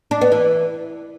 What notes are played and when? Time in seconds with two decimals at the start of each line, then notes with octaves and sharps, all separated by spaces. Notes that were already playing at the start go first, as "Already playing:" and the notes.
0.11 D4
0.21 B3
0.32 E3